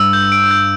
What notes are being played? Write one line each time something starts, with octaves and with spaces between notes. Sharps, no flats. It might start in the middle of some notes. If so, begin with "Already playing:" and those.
Already playing: G2 E6
G6
D7
G6